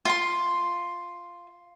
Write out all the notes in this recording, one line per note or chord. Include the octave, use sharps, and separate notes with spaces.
F4 C6